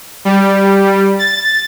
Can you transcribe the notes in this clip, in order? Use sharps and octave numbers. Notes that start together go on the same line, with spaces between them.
G3
A6